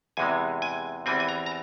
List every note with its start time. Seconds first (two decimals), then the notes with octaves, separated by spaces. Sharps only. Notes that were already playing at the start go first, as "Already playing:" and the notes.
0.17 E2 C3 E3 G#3 G#5
0.62 G#5
1.06 E2 E3 G3 C4 G#5
1.20 G#5
1.29 A#5
1.46 A#5